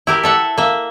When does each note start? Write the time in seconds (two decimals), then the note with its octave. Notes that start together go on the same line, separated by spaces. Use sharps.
0.07 E4 G4 A#4
0.23 A4 E5 F#5
0.58 A#3 E5